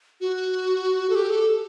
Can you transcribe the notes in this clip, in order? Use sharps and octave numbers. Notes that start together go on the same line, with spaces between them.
F#4
A4
G4
A4